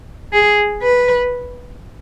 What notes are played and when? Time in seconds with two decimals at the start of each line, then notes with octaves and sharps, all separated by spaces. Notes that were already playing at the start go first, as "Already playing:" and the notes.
0.33 G#4
0.83 B4